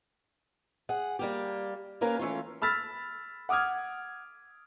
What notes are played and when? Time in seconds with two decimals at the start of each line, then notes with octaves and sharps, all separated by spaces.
0.89 G#4 F#5
1.19 G3 A#3 G4
2.01 A#3 C#4 A#4 B4 F5
2.19 E3 A3 C#4 F4
2.62 B5 E6 F6 A6 B6
3.49 F#5 D6 D#6 F6 G#6